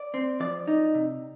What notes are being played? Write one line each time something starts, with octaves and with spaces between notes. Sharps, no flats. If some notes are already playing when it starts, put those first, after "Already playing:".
Already playing: D5
C4
F3 D5
D#4
C3